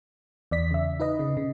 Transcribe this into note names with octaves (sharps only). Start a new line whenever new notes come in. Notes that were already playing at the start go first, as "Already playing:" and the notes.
E2 D5 B6
C#3 E5
D#4 B4 D#5
C#3
C#3